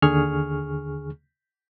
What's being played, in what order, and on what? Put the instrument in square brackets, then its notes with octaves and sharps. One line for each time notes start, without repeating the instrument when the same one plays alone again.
[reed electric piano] D#2 D3 G#4 C#6 F6